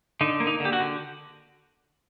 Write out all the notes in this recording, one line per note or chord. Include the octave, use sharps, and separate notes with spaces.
D3 D#4
A#3
D#4
D3
G4
F#4
D3